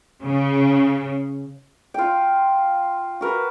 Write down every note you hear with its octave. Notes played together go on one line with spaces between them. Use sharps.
C#3
F4 G5
F#4 A#4 B4